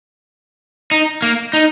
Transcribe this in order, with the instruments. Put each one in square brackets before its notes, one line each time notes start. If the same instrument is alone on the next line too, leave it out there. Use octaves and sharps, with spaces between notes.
[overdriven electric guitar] D#4
A#3
D#4